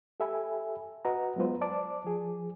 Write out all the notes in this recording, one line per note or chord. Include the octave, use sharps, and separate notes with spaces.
G4 A4 E5 G#5 B5
F#4 B4 D#5 F#5 A#5
F#3 G#3 B3 F4 B4 C5
C5 D5 A5 D6
F3 G#4